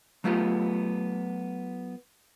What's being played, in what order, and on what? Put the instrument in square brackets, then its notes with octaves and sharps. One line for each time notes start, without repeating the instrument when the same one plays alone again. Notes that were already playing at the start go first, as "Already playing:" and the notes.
[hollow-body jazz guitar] F#3 A3 B3 F4 G4